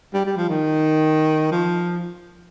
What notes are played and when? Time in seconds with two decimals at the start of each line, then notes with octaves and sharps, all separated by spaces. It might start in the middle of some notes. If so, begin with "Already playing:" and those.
0.14 G3
0.26 G3
0.37 F3
0.49 D#3
1.52 F3